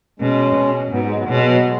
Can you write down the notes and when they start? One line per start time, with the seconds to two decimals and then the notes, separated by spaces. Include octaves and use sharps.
0.20 B2 G#3 C#4
0.55 B2
0.91 G#2 F#3 B3
1.04 G#3
1.15 F#3 B3
1.28 B2 G#3 C#4
1.46 F#3 B3
1.64 G#3